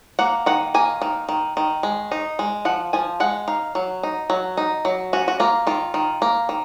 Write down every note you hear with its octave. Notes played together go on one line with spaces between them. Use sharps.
A#3 F#5
D#3 F#5
A#3 G#5
D#3
D#3
D#3
G#3
D#4
G#3
F3 F#5
F3 G#5
G#3 F#5
D#4 F5
F#3
D#4
F#3
D#4
F#3
C#4 F#4
F#4
A#3 F4
D#3 F4
D#3
A#3
D#3